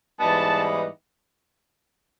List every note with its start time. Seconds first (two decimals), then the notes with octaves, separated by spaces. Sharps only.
0.20 G#2 E3 G3 B3 D#4 A5